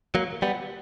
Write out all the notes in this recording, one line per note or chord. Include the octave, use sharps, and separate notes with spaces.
F#3 A#3
G3 B3